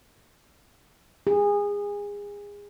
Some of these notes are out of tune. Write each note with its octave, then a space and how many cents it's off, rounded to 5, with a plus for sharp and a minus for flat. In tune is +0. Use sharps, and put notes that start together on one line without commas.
G#4 -25